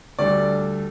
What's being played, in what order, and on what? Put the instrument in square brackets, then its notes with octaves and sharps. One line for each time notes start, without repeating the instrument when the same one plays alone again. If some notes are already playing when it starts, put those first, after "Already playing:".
[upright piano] D2 D3 G3 D5